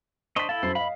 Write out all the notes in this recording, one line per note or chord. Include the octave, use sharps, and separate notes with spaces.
D4 C5 D#5 C#6 B6
E4 A4 F5 A5
F#2 C5 C7
D#5 F5 B5